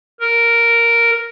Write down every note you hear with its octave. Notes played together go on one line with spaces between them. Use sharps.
A#4